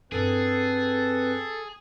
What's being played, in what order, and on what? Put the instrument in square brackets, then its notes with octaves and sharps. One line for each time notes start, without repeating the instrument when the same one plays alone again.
[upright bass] G2 D#4 [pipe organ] C4 B4 [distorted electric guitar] G#4 [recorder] A4